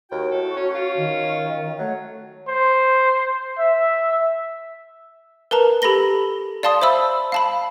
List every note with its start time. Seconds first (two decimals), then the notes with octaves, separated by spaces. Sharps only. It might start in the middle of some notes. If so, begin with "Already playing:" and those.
0.11 D#2 F#4 G5
0.31 A2 A4
0.56 C#4 C#5
0.74 F4
0.97 D#3
1.79 F#3 A3
2.48 C5
3.58 E5
5.51 A#4 B4 A5 A#5
5.82 G4 A4 B5 A#6 G7
6.63 D5 F5 A5 C6 D#6
6.82 C5 E5 B5 E6
7.32 F5 A5 B5